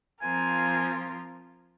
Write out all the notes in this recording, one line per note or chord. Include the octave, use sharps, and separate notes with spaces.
F3 C4 F4 A#4 G#5